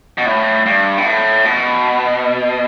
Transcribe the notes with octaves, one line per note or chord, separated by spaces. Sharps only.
B2
A2
G2
B2
A2
B2